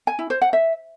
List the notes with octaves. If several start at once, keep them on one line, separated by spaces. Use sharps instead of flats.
G#5
E4
C5
F#5
E5